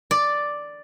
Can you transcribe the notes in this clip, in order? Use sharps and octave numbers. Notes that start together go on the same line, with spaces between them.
D5